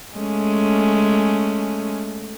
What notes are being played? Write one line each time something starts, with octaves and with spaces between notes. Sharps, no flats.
G#3 A3 C#4